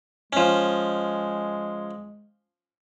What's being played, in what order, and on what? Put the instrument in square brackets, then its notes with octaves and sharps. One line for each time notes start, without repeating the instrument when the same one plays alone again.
[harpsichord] F3 C#4 [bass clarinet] G#3